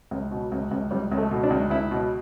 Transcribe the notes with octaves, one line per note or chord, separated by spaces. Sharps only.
C#2
B2
C#2
C#2
C#2 G3
C#2
A3
B2
D4
C#2
C#2 E4
B2